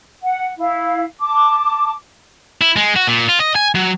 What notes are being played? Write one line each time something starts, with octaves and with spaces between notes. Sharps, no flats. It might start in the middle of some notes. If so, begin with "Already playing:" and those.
F#5
E4 F5
A5 D6
E4
G#3
F#4
A#2
F4
D#5
G#5
F#3